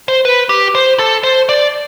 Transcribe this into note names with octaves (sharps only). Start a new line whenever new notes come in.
C5
B4
G4
C5
A4
C5
D5